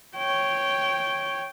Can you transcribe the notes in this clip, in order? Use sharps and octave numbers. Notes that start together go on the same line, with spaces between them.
C#5 G5